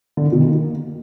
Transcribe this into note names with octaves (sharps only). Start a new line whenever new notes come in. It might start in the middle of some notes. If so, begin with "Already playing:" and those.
D3
D#3
B2
D#3
A#3